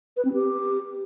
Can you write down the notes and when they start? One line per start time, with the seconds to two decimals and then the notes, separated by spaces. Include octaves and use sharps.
0.16 B4
0.25 C4
0.33 G4